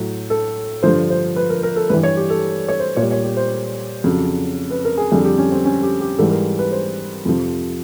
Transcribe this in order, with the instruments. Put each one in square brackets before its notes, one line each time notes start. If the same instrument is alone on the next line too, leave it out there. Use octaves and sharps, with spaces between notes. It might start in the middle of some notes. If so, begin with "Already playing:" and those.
Already playing: [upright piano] A2 F#3
A4
G2 D3 F3 C5
C5
B4
A#4
A#4
A4
G2 E3 G3 B4
C#5
G4
A4
C#5
C5
A#2 C#5
G3
C#5
G4
C5
F2 C#3 F#3
B4
A#4
G#4
F2 D3 G3 G#4
G4
C#4
C4
C#4
G4
G4
G#2 E3 G3 A4
A#4
B4
C5
F2 C3 F3